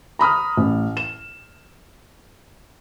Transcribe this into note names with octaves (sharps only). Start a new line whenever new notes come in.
A#5 B5 D#6 F6
A1
E7